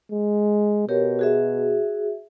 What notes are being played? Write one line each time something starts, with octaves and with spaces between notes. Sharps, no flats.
G#3
B2 G4 A#4 C#5
F#4 G#4 E5